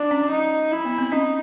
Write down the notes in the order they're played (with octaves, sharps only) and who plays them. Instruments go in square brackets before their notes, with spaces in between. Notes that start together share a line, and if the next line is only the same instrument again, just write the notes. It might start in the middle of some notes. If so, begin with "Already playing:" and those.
Already playing: [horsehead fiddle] D4
[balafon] C#4
[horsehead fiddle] D#4
E4
[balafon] B3
C4
[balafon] C#4 [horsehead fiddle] D#4